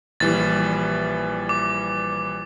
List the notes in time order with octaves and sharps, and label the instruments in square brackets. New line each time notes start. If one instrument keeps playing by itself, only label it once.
[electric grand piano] A#1 E3 G3 [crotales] A6
[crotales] D6